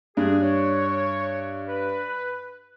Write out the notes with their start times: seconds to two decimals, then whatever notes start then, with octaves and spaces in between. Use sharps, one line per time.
0.17 G2 G#4
0.41 C#5
1.68 B4